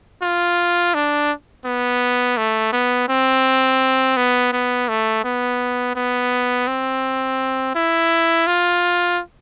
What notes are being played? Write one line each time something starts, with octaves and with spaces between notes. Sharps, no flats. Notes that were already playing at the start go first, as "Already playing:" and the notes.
F4
D4
B3
A3
B3
C4
B3
B3
A3
B3
B3
C4
E4
F4